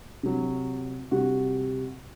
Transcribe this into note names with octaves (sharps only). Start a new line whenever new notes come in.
C3 F#3
C3 G3 F#4